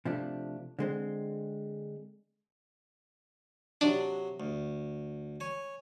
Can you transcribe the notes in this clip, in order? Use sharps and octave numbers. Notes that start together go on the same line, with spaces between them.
C3 F3 A3 D4
D3 G#3 C4
C3 F#3 D4 D#6
D2
C#5 G#5